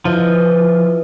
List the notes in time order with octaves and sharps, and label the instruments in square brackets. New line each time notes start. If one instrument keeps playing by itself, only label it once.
[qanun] E3 A4 D#5 [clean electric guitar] F3